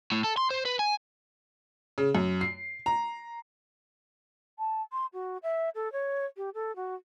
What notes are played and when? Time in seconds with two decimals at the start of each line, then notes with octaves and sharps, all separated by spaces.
0.12 A2
0.24 A4
0.37 C6
0.51 C5
0.65 B4
0.79 G#5
1.98 C#3
2.15 F#2
2.41 C7
2.86 A#5
4.59 A5
4.92 C6
5.13 F#4
5.43 E5
5.75 A4
5.92 C#5
6.37 G4
6.54 A4
6.76 F#4